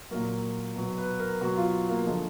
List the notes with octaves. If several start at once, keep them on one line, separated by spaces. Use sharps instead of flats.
A#2 F#3 A#4
B2 F#3
B4
A#4
B2 F#3 F#4
F4
A#3
D3 F3 G#3